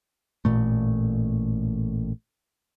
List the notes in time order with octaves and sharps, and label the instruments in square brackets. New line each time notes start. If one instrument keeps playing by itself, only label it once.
[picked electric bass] A1 A#2 A3